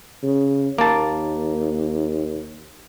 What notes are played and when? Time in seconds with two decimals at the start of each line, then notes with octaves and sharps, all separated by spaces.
0.23 C#3
0.78 D#2 A#3 A5